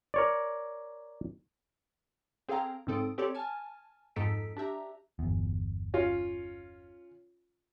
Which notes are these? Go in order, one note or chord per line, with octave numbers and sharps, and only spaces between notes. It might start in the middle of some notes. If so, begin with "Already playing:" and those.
A#4 C#5 D5
C4 G#4 A4 F5 G5 A#5
G#2 C#3 C4 A4 D#6 D7
C4 G4 A4 C#5 D5
G#5 A5 F6
F2 G#2 D#4 A4 B6 D7
D4 G4 E5 A#5
G1 E2
C#4 F4